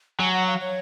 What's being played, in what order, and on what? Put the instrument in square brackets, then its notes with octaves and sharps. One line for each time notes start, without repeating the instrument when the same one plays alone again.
[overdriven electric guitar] F#3 [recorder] G#5
[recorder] F#5
F5
C#5